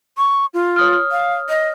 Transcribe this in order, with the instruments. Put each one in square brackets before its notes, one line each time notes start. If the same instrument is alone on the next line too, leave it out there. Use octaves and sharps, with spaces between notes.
[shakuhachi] C#6
F4
[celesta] C#5 D#6 F6
[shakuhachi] F5
D#5